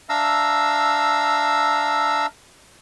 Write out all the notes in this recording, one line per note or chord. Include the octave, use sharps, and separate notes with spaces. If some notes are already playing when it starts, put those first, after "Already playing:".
D4 E5 F5 A#5 E6